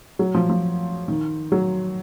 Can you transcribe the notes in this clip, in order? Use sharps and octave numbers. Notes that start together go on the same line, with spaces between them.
F#3
F3
F3
D#3
F#3